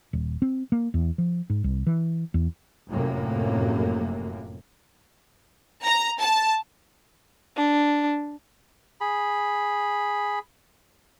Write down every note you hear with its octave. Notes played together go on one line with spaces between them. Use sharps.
D#1
C4
A#3
E2
F3
G#2
C2
E3
E2
F1 F#2 A2 C3 A#3
A#5
A5
D4
G#4 B5